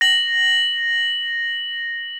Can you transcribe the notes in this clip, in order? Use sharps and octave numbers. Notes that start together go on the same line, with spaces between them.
A#6 F#7